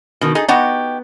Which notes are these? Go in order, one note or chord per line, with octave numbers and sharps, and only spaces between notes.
B2 D#3
D#4 G#4 A4
B3 D#4 F#4 G4